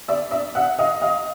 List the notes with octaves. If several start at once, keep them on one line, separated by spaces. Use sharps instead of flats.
D5 E5
D5 E5
E5 F#5
D#5 F5
D#5 F5